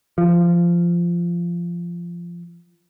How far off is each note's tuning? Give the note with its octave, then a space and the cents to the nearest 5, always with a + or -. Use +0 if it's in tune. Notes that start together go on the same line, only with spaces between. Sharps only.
F3 -15